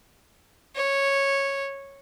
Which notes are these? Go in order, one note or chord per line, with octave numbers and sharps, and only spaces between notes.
C#5